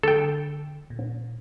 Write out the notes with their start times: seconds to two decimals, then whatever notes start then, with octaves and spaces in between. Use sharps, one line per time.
0.03 D3 A4 G5
0.90 A#2